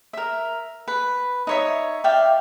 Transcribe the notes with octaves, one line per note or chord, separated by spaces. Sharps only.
A#4 E5
B4
D#4 C#5 E5
D5 E5 F5 G5